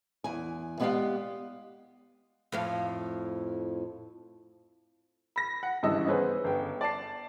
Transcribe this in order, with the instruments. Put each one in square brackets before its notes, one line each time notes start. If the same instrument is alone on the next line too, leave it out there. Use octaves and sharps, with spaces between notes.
[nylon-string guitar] E2 G#5
G#3 B3 G4 D5 F5 G5
[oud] F2 A2 F5
[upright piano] B5 A#6
F#5
G#1 G2 C#3 E3 D#5 E6
B3 C#4 G#4 B4 C5
G1 G5
D5 A5 C7